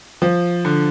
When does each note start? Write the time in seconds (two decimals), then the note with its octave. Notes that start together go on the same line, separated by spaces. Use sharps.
0.22 F3
0.65 D3